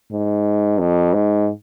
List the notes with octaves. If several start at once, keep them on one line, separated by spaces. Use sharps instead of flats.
G#2
F2
G#2